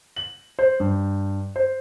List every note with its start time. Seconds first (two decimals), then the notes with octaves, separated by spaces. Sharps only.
0.16 F#7
0.59 C5
0.80 G2
1.56 C5